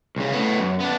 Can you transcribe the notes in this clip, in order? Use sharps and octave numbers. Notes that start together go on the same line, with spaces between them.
C2 C#3
A2 B3
F#2
B3 D4